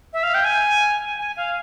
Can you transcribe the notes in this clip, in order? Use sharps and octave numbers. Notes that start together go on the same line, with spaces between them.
E5
F5
G5
G#5
G#5
F5